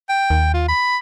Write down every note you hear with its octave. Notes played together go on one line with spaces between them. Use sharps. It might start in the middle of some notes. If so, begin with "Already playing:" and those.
G5
D#2
F4
B5